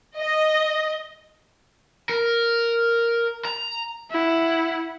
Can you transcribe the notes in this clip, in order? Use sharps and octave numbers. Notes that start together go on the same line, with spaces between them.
D#5
A#4
A#5
E4 F#5